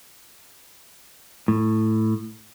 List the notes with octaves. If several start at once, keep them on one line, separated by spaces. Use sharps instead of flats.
A2